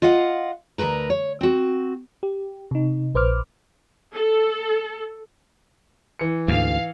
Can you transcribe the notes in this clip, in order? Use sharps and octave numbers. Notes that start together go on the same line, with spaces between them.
F4 D#5 F5 F#5
D2 B2 A#4 B4 A#5
C#5
C4 F#4
G4
C3 D#4
A#1 B4 C5 D6 F6
A4
E3 C#7
D2 G#2 C4 F5